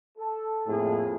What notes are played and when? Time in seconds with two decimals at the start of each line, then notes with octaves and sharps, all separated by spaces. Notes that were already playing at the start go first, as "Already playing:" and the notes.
0.18 A4
0.67 F2 A2 A#3 G#4